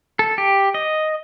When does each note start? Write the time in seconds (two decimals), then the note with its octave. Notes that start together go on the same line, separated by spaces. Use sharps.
0.19 A4
0.38 G4
0.74 D#5